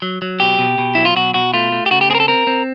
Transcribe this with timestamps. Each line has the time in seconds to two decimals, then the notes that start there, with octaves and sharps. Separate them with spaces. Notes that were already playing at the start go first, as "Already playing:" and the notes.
0.02 F#3
0.22 F#3
0.40 B2 G4
0.59 B2
0.78 B2
0.95 F#3 E4
1.05 F4
1.16 B2 F#4
1.34 B2 F#4
1.54 A3 F4
1.72 A3
1.86 G4
1.91 C#3 F#4
2.01 G4
2.10 C4 G#4
2.15 A#4
2.20 A4
2.28 C4 A#4
2.47 C4